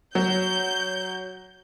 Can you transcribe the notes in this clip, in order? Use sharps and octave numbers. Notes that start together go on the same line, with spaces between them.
F#3 G6